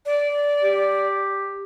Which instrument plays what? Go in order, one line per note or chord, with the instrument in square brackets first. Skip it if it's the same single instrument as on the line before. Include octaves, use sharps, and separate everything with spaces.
[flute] D5
[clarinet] G4